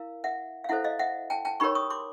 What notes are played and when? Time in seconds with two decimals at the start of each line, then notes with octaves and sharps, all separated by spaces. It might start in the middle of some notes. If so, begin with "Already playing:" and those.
Already playing: E4 A#4 F5
0.24 E5 F#5
0.64 F5
0.69 E4 A4 C5 E5 F#5
0.84 D#5 F5
0.99 E5 F#5
1.30 G5 A5
1.45 G5 A5
1.60 D#4 G4 A#4 C#5 B5 C#6
1.75 C#6 D#6
1.90 C6 D6